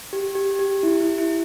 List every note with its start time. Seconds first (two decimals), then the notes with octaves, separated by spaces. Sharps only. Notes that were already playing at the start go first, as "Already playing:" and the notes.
0.13 G4
0.35 G4
0.59 G4
0.83 E4
1.01 E4
1.18 E4